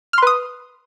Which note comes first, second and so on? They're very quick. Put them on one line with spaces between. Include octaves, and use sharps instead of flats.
F6 C6 B4 D#6